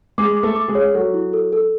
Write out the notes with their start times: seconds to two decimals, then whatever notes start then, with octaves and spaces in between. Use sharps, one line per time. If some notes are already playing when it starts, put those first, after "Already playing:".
0.18 G#3 G#4 D6
0.37 D6
0.43 A3 A4
0.56 D6
0.68 G#3 G#4
0.75 C#5
0.94 F#3 F#4 A4
1.14 E4
1.33 A4
1.53 A4